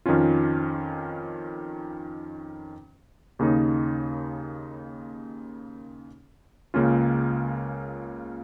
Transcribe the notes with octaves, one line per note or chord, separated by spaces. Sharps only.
F2 D#3 C#4 F4
D#2 C#3 A#3 D#4
C#2 C#3 A#3 C#4 F4